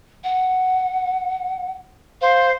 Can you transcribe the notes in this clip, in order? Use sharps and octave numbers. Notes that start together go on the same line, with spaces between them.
F#5
C5 F5